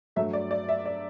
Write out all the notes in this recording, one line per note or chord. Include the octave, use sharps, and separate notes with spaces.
G2 F#3 A3 E5
D5
D5
E5
D5